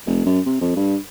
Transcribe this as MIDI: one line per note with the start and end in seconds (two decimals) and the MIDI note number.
0.06 0.21 29
0.25 0.40 42
0.46 0.59 48
0.61 0.71 41
0.76 0.96 43